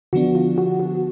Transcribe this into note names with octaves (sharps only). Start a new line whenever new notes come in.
D3 F3 B3 D4 F#4
F4
F#4
F#4